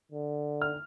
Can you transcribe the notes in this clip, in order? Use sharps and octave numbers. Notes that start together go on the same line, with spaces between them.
D3
F6